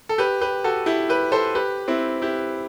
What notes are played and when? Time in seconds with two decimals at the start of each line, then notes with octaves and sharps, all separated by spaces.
0.09 A4
0.18 G4 B4
0.41 G4 B4
0.64 F#4 A4
0.86 E4 G4
1.09 G4 B4
1.32 A4 C5
1.55 G4 B4
1.88 C4 E4
2.22 E4 G4